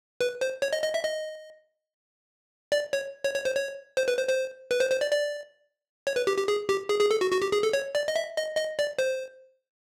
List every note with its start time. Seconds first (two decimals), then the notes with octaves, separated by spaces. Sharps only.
0.21 B4
0.41 C5
0.62 C#5
0.73 D#5
0.83 D#5
0.94 E5
1.04 D#5
2.72 D5
2.93 C#5
3.24 C#5
3.34 C#5
3.45 C5
3.55 C#5
3.97 C5
4.08 B4
4.17 C5
4.29 C5
4.71 B4
4.80 C5
4.91 C5
5.01 D5
5.12 D5
6.07 C#5
6.16 B4
6.27 G4
6.37 G4
6.48 G#4
6.69 G4
6.89 G#4
7.00 G#4
7.11 A4
7.21 F#4
7.32 F#4
7.42 G4
7.52 G#4
7.63 A4
7.73 C#5
7.95 D5
8.08 D#5
8.16 E5
8.37 D#5
8.57 D#5
8.79 D5
8.99 C5